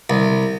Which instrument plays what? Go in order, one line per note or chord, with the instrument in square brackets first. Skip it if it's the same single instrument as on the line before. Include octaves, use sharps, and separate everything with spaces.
[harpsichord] C2